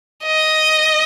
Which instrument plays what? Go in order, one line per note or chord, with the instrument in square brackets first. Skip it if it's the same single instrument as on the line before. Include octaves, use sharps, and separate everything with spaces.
[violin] D#5